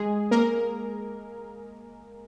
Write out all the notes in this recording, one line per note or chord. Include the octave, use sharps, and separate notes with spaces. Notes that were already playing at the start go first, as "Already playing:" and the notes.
Already playing: G#3 G#4
A#3 A#4